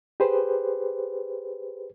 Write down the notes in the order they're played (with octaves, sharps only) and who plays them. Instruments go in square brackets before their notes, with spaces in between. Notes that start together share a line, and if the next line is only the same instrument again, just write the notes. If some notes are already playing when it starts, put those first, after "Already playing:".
[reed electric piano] G4 G#4 B4 C5